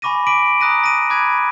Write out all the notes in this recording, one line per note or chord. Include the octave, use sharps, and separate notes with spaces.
G#5 B5 C#6 D6 A#6 D#7
D6 B6 D7 D#7 F#7
A#5 D#6 F#6 A#6 D#7
A#6 D7 D#7
B5 D6 F#6 G#6 A#6 B6